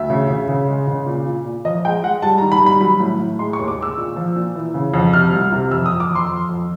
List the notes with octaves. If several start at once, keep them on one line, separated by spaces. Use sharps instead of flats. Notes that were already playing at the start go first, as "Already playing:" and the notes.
Already playing: D2 E5
C#3
C#3
C#3
G#3
C#3
A#2
A#2
A#2
F3 D#5
G#3 G5
G#3 F#5
G3 A5
A#5
D#3
B5
G3
B5
F#3 B5
A2
A2
G#3 C6
C#6
D#2
D6
G#3 E6
A#2
F3
A#2
E3
C#3
F2
C3 F6
C2
C3
F2 E6
D#6
F2
D6
F2
C6
F2
F2